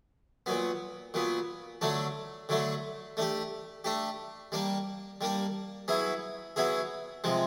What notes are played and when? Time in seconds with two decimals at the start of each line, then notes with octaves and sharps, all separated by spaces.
0.46 A#2 F#3 B3
1.14 A#2 F#3 B3
1.81 D3 F#3 A3 D4
2.49 D3 F#3 A3 D4
3.17 A3 D4 G4
3.84 A3 D4 G4
4.52 G3 A#3 D4
5.21 G3 A#3 D4
5.88 F#3 B3 E4 G#4
6.56 F#3 B3 E4 G#4
7.24 C3 F3 G#3